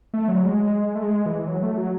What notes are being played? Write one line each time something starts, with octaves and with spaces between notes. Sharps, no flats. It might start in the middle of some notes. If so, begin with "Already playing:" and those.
A3
F#3
G#3
A3
G#3
E3
F#3
A3
F#3